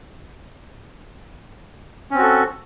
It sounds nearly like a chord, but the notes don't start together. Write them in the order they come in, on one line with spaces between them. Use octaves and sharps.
C#4 C4 F#4 A4